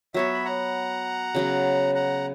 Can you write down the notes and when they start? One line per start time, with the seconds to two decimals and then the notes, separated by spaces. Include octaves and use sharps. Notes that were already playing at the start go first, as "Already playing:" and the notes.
0.14 F#3 B3 F#4 C#5 E5
0.34 B5
0.45 F#5 A#5
1.35 C#3 F#3 B3
1.95 F#5 A#5